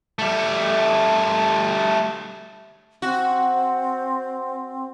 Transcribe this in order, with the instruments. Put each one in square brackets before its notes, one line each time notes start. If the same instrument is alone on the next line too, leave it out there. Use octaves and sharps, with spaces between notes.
[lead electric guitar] G3 A3
[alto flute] C4 [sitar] F#4